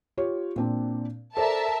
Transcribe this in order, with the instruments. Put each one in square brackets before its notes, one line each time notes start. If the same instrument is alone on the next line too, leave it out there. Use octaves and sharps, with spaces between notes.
[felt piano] F4 G4 C#5
A#2 C4 D4
[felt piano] A4 C5 D5 [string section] A#4 E5 A5